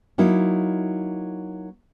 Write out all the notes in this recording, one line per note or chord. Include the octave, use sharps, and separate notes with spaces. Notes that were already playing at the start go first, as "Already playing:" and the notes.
F#3 A#3 D#4 E4